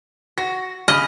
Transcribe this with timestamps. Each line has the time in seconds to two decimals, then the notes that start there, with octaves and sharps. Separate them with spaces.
0.38 F#4 A#6
0.88 C#3 D#5 B5 D#6 F6